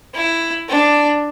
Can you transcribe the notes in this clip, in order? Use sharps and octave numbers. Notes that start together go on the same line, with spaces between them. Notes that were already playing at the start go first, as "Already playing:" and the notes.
E4
D4